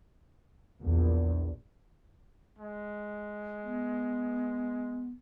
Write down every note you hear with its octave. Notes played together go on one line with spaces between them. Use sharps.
A#1 E2
G#3
B3